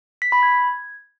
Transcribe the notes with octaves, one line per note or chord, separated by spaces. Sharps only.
B6
B5
G#6